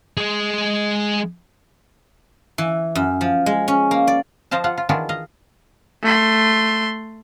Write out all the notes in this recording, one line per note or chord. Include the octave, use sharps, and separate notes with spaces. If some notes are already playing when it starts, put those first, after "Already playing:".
G#3 G#4
E3
F#2
F3
G#3
C#4
A#3
D5
F3 C5 D#5 F5 A5
F4 F5 F#5
F4
D#3 E3 D4 F4 F#4 G#4
D#5 F5
A3 C6